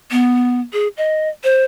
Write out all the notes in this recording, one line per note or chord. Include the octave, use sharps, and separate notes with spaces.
B3
G#4
D#5
C5